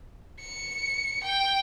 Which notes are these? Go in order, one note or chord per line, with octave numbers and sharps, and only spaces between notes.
C#7
G5